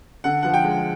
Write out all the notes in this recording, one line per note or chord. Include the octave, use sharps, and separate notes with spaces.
D3 F#5
F3 F#5
G5
G#3